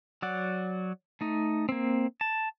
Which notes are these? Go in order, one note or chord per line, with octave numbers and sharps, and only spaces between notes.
F#3 D5 F#5
A3 D#4
A#3 C4
A5